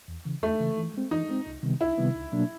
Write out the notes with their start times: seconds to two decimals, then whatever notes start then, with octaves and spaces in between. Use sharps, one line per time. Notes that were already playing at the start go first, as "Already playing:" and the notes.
0.08 E2
0.25 C#3 E3
0.42 E2 A3
0.60 C#3 E3
0.77 E3
0.94 G#3 C4
1.11 E3 D#4
1.28 G#3 C4
1.47 C2
1.63 C3 D#3 G3 B3
1.80 C2 E4
1.98 C3 D#3 G3 B3
2.15 C#2
2.32 B2 F#3 A#3 D4